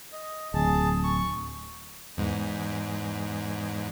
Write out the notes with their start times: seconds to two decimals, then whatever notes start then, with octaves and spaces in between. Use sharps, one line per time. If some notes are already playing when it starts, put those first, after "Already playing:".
0.12 D#5
0.54 D1 G#4 A5
1.04 C#6
2.17 E2 G#2